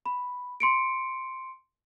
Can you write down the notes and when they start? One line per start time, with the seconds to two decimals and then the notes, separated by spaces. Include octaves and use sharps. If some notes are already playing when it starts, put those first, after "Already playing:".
0.06 B5
0.60 C6 C#7 D7